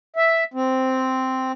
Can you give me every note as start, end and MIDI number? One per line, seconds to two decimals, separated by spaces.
0.16 0.44 76
0.54 1.52 60